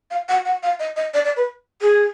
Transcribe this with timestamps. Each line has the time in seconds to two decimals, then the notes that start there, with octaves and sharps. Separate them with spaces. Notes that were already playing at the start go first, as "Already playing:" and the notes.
0.11 F5
0.29 F#5
0.45 F#5
0.63 F5
0.80 D#5
0.96 D#5
1.14 D5
1.25 D5
1.37 B4
1.81 G#4